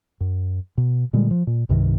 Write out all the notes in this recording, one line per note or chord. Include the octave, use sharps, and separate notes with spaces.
F#2
B2
A#2 D3 G3 G#3
F3
A#2
C2 G2 C3 D#3